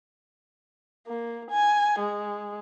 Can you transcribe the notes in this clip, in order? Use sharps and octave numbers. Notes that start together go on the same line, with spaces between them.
A#3
G#5
G#3